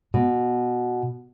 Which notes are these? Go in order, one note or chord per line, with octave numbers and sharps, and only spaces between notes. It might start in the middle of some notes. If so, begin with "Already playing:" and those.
B2